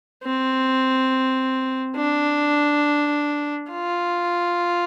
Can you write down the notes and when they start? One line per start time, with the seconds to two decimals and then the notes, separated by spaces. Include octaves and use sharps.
0.24 C4
1.97 D4
3.71 F4